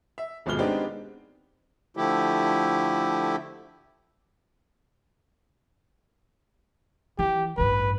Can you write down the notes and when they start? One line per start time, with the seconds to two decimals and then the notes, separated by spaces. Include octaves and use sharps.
0.18 E5
0.46 D#1 G#1 B2 G#3 F6 G7
0.59 G#3 B3 C4 D4 D#4 G4
1.97 D3 F3 A3 E4 G4
7.19 E3 G4
7.57 A1 G2 B4